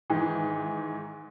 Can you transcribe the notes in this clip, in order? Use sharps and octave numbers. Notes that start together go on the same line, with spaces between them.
G#2 D#3 E3